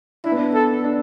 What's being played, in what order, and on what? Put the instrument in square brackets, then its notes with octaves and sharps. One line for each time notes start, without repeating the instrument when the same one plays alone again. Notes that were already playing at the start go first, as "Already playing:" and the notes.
[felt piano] D4 [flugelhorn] E4
[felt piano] B3
D4
[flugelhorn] A4
[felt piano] D4